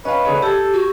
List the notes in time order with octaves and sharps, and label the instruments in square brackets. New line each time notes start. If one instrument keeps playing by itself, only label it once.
[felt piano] C#4 F5 [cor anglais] B4 [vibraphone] D#5
[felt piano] D3 G#4 C#5
[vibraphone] G4 [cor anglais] A4 [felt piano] E6 G#6
[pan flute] F#4